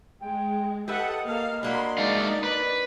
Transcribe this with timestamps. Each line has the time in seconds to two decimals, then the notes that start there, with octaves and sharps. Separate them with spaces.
0.22 G#3 G5
0.88 G4 A4 B4 D#5 E5 F#5
1.27 A#3 A4 F5
1.63 F#3 A#3 D4 B5 C6
1.98 G#3 A3 D#4 D5 F5
2.44 B4